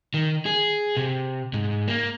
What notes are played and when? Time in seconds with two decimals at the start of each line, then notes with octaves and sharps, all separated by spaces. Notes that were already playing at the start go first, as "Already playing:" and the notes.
0.14 D#3
0.46 G#4
0.97 C3
1.53 G#2
1.87 A#3